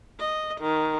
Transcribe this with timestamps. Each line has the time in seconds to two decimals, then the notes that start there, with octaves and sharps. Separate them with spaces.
0.19 D#5
0.61 D#3